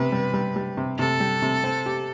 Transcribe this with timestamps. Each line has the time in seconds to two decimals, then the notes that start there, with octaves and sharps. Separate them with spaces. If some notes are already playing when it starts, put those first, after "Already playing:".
Already playing: C3 B3 B4
0.12 G3
0.34 G3
0.56 G3
0.77 C3
0.99 C3 A4
1.20 G3
1.42 C3
1.64 C4
1.86 G4